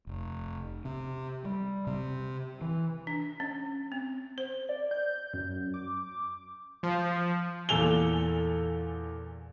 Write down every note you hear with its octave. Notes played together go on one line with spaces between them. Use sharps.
F1
C3
G3
C3
E3
D4
C#4
C4
C5
D5
G6
F#2
D6
F3
E2 A#2 A4 G#5 F7 G7